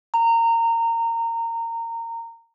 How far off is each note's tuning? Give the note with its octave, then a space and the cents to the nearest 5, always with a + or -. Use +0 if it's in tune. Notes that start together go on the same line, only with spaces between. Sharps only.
A#5 -20